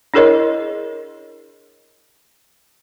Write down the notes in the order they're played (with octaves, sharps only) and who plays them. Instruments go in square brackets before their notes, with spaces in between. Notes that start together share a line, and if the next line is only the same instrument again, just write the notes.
[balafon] D4 E4 G#4 A#4 C#5 D#5